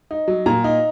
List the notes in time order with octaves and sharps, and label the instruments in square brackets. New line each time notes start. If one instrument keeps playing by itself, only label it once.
[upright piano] D#4
F#3
A#2 A#5
D#4